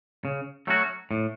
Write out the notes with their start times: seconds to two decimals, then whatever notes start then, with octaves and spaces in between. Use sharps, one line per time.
0.25 C#3
0.67 F#3 A3 C#4 F#4
1.11 A2